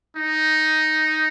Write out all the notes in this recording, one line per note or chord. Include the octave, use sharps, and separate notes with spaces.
D#4